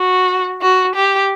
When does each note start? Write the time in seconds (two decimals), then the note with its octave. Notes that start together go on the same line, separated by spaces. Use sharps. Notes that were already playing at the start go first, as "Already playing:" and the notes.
Already playing: F#4
0.62 F#4
0.95 G4